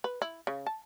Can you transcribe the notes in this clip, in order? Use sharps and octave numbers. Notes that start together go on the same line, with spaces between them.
B4
E4
C#3
A5